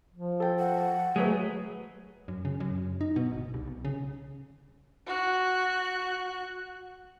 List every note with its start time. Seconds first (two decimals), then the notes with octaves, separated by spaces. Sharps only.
0.14 F3
0.40 A4 G5
0.59 F#5
1.16 F#3 G#3 A3 G#4 B4
2.28 F#2
2.45 C#3
2.60 F#2
2.78 F#2
3.01 D#4
3.16 B2
3.31 G1
3.54 C2
3.68 B1
3.85 C#3
5.07 F#4 F#6